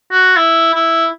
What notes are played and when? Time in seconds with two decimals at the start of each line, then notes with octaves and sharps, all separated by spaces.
0.12 F#4
0.36 E4
0.74 E4